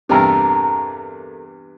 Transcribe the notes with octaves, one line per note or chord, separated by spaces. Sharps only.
E2 G2 C3 A4 A#4